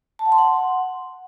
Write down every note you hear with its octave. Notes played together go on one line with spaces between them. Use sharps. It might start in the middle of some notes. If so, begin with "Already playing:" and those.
A5
F#5
C6
F#5